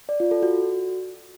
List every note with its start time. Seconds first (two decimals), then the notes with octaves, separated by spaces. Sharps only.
0.09 D5
0.20 F4
0.31 A4
0.43 F#4